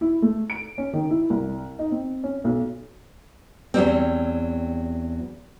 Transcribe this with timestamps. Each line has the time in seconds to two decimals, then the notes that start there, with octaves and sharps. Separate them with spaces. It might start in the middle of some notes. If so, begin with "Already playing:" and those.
0.01 E4
0.22 A3
0.50 D7
0.78 C#4
0.93 D#3
1.10 E4
1.30 C2
1.79 D#4
1.91 C4
2.24 C#4
2.44 B1
3.74 E2 F#3 G3 C4